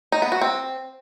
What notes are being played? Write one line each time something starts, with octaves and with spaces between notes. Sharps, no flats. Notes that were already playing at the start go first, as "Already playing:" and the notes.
D#4
B3
F#4
C4